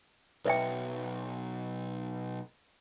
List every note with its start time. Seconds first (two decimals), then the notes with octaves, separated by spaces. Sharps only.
0.45 B1 B4 E5 G5